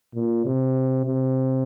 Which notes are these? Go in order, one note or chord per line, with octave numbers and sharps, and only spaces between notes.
A#2
C3
C3